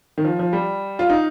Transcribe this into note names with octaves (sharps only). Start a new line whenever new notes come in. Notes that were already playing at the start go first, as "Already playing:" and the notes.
D#3
F3
F3
G3
F4
D#4